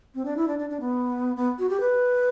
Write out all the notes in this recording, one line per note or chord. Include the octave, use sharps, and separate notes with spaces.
C4
D4
E4
D4
D4
D4
B3
B3
F#4
G4
B4